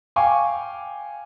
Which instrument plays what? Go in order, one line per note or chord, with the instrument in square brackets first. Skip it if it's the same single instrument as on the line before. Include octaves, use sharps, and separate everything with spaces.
[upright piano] F5 G5 G#5 C#6 D6